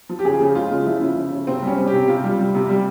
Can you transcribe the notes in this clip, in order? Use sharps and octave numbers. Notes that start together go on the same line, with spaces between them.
F3
G4
C#3 G#4
C#3
G#3 F4
C#3
F3 E4
C#3
C#3
C#3
C3 C4
G3 C#4
G3
G4
C3
C3 F4
G3
G3
C3
G3